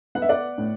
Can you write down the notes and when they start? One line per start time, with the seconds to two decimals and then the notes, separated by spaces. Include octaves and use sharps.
0.15 B3 F#5
0.22 E5
0.29 D5 F#5
0.58 A2